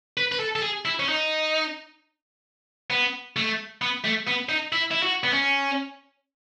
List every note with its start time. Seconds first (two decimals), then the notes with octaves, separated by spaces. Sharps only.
0.17 B4
0.32 B4
0.39 A4
0.56 A4
0.62 G#4
0.85 E4
0.99 C#4
1.08 D#4
2.90 B3
3.36 A3
3.82 B3
4.05 A3
4.27 B3
4.49 D#4
4.72 E4
4.91 E4
5.02 F#4
5.24 B3
5.33 C#4